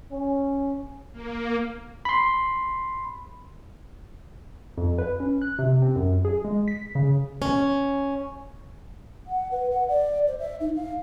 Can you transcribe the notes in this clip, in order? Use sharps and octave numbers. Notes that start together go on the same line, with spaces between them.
C#4
A#3
B5 C6
F2
B4
C#4
F#6
C3
C4
F#2
G#4
G#3
B6
C#3
C#4
F#5
B4
F#5
D5
C5
E5
D#4
F5